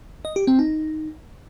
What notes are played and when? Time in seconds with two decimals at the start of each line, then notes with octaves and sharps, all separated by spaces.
0.25 D#5
0.36 G4
0.47 C4
0.59 D#4